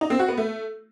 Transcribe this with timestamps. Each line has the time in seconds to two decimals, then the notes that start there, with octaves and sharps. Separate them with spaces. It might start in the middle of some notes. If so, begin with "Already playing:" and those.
0.01 D#4
0.10 C4
0.19 F#4
0.28 B3
0.37 A3